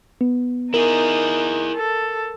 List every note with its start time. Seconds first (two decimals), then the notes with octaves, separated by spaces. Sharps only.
0.21 B3
0.74 D#4 E4 G#4 A#4
1.76 A4